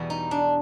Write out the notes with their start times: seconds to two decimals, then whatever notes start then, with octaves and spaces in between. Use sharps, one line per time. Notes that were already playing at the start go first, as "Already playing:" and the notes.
Already playing: E2 B2 G3 B3
0.10 D#4
0.31 D4